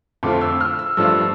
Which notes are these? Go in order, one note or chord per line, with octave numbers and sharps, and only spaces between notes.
F2 D3 A3 C4 F4 D6
E6
F6
E6
G2 F3 A3 D4 F4 E6